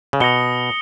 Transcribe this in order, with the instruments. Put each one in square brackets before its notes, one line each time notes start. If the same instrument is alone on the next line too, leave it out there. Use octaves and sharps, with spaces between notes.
[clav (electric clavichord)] C#3
[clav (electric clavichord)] B2 [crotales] D#6 A#6 C#7 G7